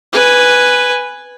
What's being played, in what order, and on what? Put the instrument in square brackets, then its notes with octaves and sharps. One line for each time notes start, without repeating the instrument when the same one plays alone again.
[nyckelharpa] B4 G#5